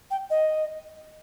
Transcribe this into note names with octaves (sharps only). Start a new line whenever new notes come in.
G5
D#5